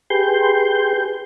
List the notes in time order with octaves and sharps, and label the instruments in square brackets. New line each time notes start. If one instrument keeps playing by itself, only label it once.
[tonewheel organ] G4 G#4 B4 C6 G6